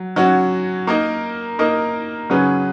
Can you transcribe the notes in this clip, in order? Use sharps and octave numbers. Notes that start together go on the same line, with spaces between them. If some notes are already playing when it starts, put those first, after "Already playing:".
Already playing: F#3
F#3 C#4 F#4
A#3 D#4 A#4 D#5
A#3 D#4 A#4 D#5
C#3 F#3 C#4 G#4 B4